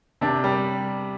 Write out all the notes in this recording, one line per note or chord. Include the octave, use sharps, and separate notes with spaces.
C3 D4
G3